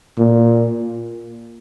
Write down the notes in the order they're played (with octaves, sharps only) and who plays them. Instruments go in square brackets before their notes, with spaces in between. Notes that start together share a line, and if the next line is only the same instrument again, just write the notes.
[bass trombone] A#2